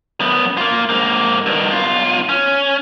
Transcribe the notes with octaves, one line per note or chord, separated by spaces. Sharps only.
F#2 B3
A#3 F4
G#2 A#3
G2 D#3
B1 F4
C#4